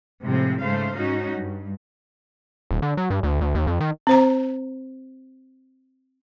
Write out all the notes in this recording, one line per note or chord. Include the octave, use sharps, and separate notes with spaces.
A2 C3 F3 G#3 C4
G#2 C#3 A3 C5 F5
G#2 C#4 D#4 F#4
G2
D#1
D3
F#3
G2
D2
D2
D#2
F2
D#3
C4 C5 A#5